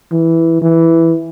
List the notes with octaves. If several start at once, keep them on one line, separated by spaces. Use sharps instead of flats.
E3
E3